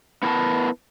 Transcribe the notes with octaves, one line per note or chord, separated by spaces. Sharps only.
B3 E4 G#4 A#4 B4 A5